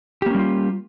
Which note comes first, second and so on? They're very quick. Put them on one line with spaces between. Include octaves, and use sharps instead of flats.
G4 A#3 C#4 G3 F4